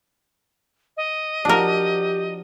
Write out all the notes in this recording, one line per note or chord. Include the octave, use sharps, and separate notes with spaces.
D#5
F3 D4 F#4 G4 A#4 D5